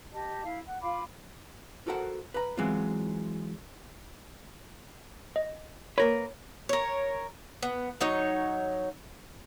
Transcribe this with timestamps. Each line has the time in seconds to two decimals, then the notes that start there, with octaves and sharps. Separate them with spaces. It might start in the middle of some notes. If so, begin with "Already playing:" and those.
0.12 G4 D#5 A5
0.44 E4 F5
0.67 F#5
0.81 F4 F5 B5 D6
1.87 F4 F#4 A4 A#4 C5 F#5
2.34 B4 A#5
2.57 E3 F#3 G#3 B3 C4 F4
5.36 D#5
5.98 A#3 A#4 B4 C#5
6.69 A#4 C#5
7.63 B3
8.01 F#3 D#4 C#5